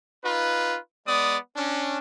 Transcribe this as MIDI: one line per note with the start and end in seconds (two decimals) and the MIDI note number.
0.24 0.78 63
0.24 0.78 65
0.24 0.78 71
1.07 1.37 56
1.07 1.37 59
1.07 1.37 74
1.07 1.37 87
1.56 1.98 61
1.56 1.98 62